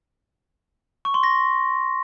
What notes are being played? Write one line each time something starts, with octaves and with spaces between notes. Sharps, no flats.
C#6
C6
A#6